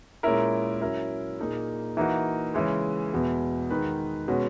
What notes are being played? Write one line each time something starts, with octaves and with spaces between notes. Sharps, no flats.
A#2 G#3 C#4 E4 A#4
F#3 C#4 E4 A#4
A#2 A#3 D#4 G#4
E3 A#3 D#4 F#4
C#3 E3 G#3
E2 B2 G#3
D#3 G#3 D#4 F#4 B4
B2 G#3 C#4 F#4